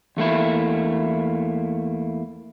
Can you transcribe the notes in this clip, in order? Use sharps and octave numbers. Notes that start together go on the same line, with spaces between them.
E2 A3 A#3 E4